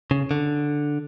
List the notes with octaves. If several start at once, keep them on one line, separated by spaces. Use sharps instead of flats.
C#3
D3